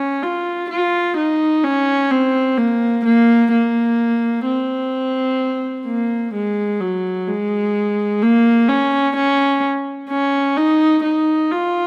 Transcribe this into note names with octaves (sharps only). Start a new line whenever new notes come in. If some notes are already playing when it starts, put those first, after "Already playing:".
Already playing: C#4
F4
F4
D#4
C#4
C4
A#3
A#3
A#3
C4
A#3
G#3
F#3
G#3
A#3
C#4
C#4
C#4
D#4
D#4
F4